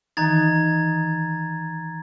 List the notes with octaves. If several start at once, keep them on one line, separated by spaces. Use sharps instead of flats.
D#3 E3 D#4 A#5 G#6 A6